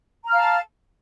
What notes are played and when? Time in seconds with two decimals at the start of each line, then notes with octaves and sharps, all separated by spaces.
0.24 A#5
0.29 F6
0.33 F5
0.37 A5